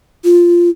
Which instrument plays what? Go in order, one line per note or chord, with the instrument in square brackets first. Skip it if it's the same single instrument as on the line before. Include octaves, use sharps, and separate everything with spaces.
[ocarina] F4